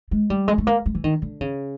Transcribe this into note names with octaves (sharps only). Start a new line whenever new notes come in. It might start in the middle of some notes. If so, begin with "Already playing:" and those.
G#3
G3
G#3
A3
A#3
G#3
E3
D#3
D3
C#3